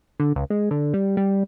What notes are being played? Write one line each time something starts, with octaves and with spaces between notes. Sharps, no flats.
D3
C#2
G#3
D3
G3
G3